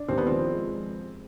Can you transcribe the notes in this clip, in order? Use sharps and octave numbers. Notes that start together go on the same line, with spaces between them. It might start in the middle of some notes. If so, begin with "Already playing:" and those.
Already playing: D4
D#2 C4
B3
F3 C4
G#3